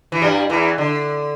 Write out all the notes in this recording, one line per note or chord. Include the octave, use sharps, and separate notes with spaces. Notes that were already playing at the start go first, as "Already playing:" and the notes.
E3
G2 G3
E2 E3
D3